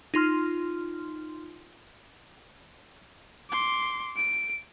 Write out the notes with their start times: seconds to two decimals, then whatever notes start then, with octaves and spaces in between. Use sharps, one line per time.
0.14 D#4 F4 C6 F6
3.50 C6 D6
4.16 D7